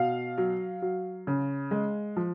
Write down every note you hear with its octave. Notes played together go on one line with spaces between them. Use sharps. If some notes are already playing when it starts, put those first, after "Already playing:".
Already playing: B2 F5
F#3
F#3
C#3
G#3
F3